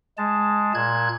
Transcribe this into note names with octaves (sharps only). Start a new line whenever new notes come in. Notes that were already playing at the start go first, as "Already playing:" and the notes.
G#3 A5
A#2 F#6 G#6